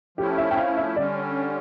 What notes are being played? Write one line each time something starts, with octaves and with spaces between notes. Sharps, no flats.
F3 A3 C#4 E4 G4
E5
G5
F5
E5
D3 G3 C#4 D5